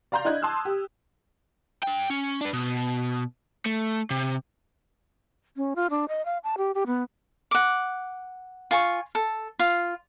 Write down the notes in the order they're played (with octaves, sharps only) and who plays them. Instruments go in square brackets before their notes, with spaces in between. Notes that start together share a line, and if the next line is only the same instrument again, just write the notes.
[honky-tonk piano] D5 F5 A#5 C6 G6
D4 E4 D#5 F#6 G#6
A5 C6 D#6 E6 F#6
G4
[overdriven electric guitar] D4 G5
C#4
D4 B4
B2
A3
C3
[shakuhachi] C#4
F4
D4
D#5
F5
A5
G4
G4
B3
[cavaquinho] F#5 D6
F4 G#5 C#6
A4
F4